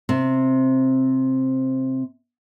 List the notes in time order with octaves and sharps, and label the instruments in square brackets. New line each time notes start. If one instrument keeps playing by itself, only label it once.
[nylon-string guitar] C3 C4